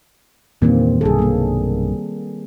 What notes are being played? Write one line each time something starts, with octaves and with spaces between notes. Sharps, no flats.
E2 G2 A#2 D#3 A#3 C4
B1 G2 C3 G#4 A4
G3 A#3